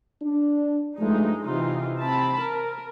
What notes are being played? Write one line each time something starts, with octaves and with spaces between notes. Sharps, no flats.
D4
G2 F3 G#3 A3 D#4
C3 E3 D#4 F4
C4 A5 B5
A#4